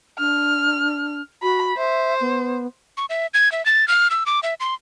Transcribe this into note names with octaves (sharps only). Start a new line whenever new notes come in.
D4 F6
F#4 B5
C5 E5
B3
C#6
E5
G#6
E5
A6
F6
E6
D6
E5
C6